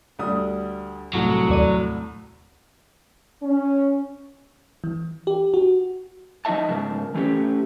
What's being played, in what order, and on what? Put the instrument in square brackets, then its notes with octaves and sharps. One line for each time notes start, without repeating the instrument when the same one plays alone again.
[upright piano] D2 G3 D#6
[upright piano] C2 A2 [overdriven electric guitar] F#3
[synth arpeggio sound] D#2 D5 D#7
[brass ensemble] C#4
[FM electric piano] E3
G4
F#4
[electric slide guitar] F3 D#4 F4 D#5 E5 A5
G#2 C#3 A#4 A5
E3 A3 C#4 G4